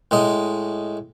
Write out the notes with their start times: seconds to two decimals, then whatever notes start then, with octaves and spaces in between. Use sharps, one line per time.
0.11 A2 G#3 D#5